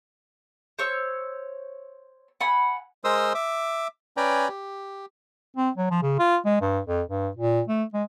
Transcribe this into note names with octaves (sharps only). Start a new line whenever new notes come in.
C5 C#5 E6
F#5 G#5 B5
G#3 A#4 C5 C6 D#6 E6
E5 D6
C#4 B4 D5 G5 G#5 A#5
G4
C4
F#3
F3
C#3
F4
G#3
G2
F2
G2
A#2
A3
G#3